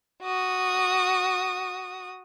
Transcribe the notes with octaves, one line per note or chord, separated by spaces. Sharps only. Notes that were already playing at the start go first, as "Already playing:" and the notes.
F#4 D#6